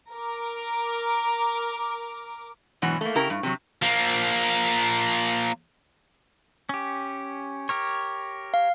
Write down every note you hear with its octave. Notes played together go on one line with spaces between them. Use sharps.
A#4 D6
G#2 B2 E3 F#3 F#4
A3 A#3
C#3 E4 G4 A#4 A#5
G2
C3 F#3
F3 A#3
C#4 G4
G4 A#4 C#5
F5